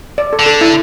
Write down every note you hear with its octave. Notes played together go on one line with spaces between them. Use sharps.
D5
A4
D3
A4
E4